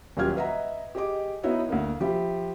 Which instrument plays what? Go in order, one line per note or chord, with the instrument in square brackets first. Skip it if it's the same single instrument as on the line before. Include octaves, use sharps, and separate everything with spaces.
[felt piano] D#1 F#3 F4 G4 F6 G#6
B4 D#5 E5 F#5 A#5
G4 G#4 D#5 D6
B3 D#4 E4 F#4 C#5 E5
D2 A#3
F3 G4 E5 B5